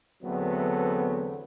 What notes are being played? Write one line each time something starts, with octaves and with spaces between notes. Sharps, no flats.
E2 D3 F#3 A3 B3 C4